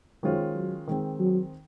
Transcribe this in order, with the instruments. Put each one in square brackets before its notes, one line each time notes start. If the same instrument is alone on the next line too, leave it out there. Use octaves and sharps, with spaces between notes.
[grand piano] D#3 G#3 C#4 F4 C5 [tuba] F#3
[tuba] F#3
[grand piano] D#3 G#3 C4
[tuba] F#3